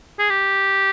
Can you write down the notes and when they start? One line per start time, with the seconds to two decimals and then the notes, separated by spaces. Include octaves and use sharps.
0.19 G#4
0.30 G4